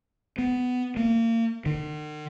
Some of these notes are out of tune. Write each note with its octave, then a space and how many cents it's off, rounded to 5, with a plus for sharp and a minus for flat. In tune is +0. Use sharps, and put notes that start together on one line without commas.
B3 +15
A#3 -30
D#3 -45